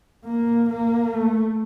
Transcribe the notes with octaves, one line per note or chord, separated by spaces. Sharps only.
A#3
A#3
A3